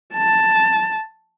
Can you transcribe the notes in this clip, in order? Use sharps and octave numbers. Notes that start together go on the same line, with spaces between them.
A5